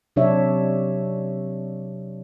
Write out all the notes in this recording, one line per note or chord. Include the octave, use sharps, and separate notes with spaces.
C3 F#3 D4 C#5 E5